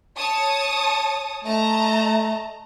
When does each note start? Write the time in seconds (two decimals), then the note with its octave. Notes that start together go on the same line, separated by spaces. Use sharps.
0.16 C#5 A5 D#6
1.44 A3 D#5 A5 A#5